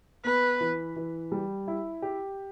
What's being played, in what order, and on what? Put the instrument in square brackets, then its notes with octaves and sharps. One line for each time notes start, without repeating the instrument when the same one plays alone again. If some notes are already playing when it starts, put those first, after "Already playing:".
[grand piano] B3 [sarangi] B4
[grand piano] E3
E3
G3
E4
G4